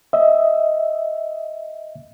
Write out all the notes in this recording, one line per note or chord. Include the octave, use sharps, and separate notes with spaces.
D#5 E5